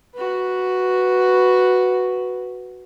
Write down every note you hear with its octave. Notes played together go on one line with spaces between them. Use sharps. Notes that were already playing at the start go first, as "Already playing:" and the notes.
F#4 B4